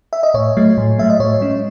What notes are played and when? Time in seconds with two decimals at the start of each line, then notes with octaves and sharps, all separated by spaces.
0.13 E5
0.23 D#5
0.34 A2 C#5
0.57 F#3 A3
0.77 A2
0.99 F#3 A3 E5
1.10 D#5
1.19 A2 C#5
1.41 G#3 C#4